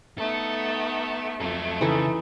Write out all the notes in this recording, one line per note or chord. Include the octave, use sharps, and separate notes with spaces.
A3 B3 D#4 A4
F2 F#3 A3 A4
C#3 E3 D#4 A4